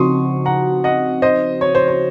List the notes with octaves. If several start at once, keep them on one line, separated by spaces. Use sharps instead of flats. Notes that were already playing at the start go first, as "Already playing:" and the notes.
Already playing: C#3 F3 C4 D#4 F#4 C6 C#6 D#6
F#5 A#5
D#5 F#5
C5 D#5
C#5
C5
C#5